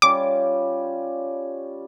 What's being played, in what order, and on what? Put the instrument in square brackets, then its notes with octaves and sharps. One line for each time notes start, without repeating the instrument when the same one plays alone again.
[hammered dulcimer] G3 C#4 F4 [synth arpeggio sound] D6